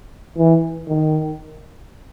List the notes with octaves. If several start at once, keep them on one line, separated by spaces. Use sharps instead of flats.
E3
D#3